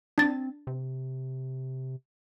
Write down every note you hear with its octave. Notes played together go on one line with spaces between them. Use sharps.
C4 D4 A6
C3